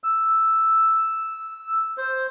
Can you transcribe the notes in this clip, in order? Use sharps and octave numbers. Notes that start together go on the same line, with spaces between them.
E6
C5